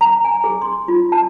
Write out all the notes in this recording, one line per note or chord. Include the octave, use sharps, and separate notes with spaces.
A#5
G#5
G#4
C6
F4
A5